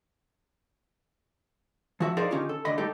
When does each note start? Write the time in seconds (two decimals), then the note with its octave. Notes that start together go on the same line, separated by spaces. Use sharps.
2.00 F3 F#4 E5
2.17 D#4 G#4 A#4 C5 D5 F5
2.31 D3 C#4 D#4 F4 G4
2.49 A4
2.65 D2 D3 D5 D#5 B5
2.78 A2 G3 A3 D#4 G4 A4